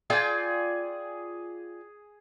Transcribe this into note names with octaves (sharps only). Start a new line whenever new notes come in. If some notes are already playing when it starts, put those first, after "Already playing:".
F4 G#4 D5 G5 G#5